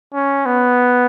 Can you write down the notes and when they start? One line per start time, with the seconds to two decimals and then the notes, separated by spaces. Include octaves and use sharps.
0.14 C#4
0.46 B3